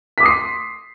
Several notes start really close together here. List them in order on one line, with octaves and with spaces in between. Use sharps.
B6 D6 D#6 C7 C6